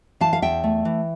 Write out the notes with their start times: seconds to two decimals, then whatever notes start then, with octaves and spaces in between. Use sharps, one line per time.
0.20 E3 F5 A5
0.33 F5
0.42 E2 E5 G5
0.64 A3
0.85 E3